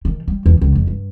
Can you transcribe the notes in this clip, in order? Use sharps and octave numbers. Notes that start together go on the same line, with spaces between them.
D#3
G3
E2
C#2
F2
G2